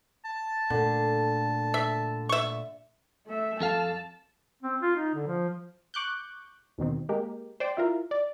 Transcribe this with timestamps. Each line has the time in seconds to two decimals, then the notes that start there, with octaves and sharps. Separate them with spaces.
0.25 A5
0.70 A#2 D3 A3
1.74 E5
2.29 E5 C#6
3.27 A3 E5
3.61 F2 A4 F5 A5
4.63 C4
4.82 F4
4.96 D#4
5.15 D3
5.27 F3
5.94 C#6 D6 F#6 G6
6.78 D#2 B2 D#3 C4
7.09 G#3 A#3 G4 A#4
7.60 C5 D5 G5
7.77 E4 F4 A#4
8.11 D5